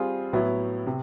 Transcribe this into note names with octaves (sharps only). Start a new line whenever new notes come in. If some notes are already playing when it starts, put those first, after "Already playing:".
Already playing: G3 C4 F4 G#4
A2 F#3 B3 E4
C3